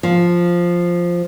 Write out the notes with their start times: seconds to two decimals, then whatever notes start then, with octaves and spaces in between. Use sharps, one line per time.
0.03 F3